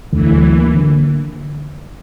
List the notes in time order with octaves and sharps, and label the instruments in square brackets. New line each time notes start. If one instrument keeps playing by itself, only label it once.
[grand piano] D2 [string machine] E3
[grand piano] F#3
A#3
D3